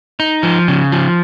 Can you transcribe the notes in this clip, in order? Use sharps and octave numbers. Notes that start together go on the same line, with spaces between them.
D#4
F3
C#3
F3